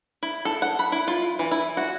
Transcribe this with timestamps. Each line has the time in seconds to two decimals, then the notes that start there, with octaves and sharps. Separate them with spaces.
0.23 E4
0.45 A4
0.62 F#5
0.79 B5
0.92 E4
1.08 F4
1.39 E3
1.51 E4
1.77 F#4